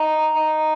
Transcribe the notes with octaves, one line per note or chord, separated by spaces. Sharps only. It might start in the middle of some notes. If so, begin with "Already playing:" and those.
Already playing: D#4
D#4